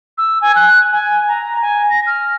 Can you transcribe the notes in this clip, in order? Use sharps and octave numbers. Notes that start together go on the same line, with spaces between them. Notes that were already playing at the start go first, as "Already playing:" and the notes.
E6
G#5
F#6
G#5
A#5
G#5
A#6
F6